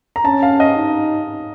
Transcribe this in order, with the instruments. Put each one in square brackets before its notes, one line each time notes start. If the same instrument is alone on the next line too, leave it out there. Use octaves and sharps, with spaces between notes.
[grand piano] A#5
[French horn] C#4 [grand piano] A5
[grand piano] F5
D#5
[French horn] D#4